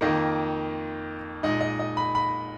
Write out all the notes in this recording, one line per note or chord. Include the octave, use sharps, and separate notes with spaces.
F2 D#3 A#3 D#5
A#2 G#3 D#4 D#5
D#5
D#5
B5
B5